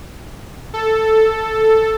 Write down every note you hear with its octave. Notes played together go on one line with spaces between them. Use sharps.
A4